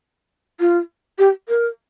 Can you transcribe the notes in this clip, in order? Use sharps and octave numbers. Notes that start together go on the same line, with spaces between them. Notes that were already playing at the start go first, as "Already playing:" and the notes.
F4
G4
A#4